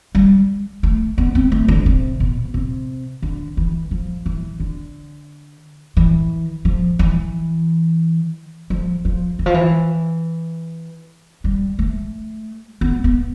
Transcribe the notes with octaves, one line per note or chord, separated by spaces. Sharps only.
G3
A3
B3
C4
A3
D3
C3
B2
C3
D3
E3
F3
E3
D3
E3
F3
E3
F3
F3
E3
F3
E3
G3
A3
B3
B3